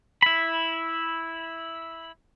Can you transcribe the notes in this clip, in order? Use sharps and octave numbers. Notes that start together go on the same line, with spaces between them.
E4 B5